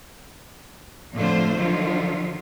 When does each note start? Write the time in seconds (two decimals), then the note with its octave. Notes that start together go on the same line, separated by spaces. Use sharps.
1.14 F2 A2 D3 A3 F4 C5
1.57 D3 D#3 F3 F#3 F4